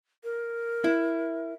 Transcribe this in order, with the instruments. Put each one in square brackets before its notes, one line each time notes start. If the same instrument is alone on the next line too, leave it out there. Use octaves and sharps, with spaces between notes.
[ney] A#4
[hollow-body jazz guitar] E4